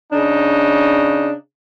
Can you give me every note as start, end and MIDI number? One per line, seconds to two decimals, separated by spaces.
0.12 1.33 49
0.12 1.33 62
0.12 1.33 63